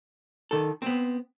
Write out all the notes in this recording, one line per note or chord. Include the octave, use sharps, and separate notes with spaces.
D#3 A4
B3 C4